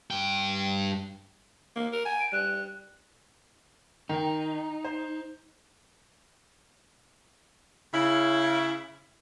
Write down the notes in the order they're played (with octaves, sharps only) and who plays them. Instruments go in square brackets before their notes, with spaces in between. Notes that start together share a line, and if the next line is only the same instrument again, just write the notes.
[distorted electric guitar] G2 G5
[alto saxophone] A#3
A#4
G#5
[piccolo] D7
[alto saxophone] G3 [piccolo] F#6
[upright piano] D#3 G5 [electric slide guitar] D#4
[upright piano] C5
[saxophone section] C#3 E4